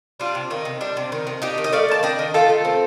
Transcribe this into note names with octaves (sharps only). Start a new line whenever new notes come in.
G3 D4 F4
C3
D#3 D#4
C3
G3 D4
C3
D#3 D#4
C3
D4 D#4 G4
D#3
D#5
A3 D5 F5
D#3 A5
D4 D#5 G5
D#3
A3 F4 A4
D#3
C4